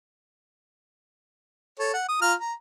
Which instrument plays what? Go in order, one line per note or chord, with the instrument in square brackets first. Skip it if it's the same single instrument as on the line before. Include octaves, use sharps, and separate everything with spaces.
[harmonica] A4 C#5
F#5
D#6
F4 A#5 F6
A#5